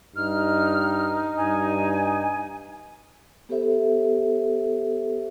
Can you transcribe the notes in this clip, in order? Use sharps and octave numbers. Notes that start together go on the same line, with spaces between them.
G2 D#4 F6
G2 G#5
B3 G4 A4 C5 E5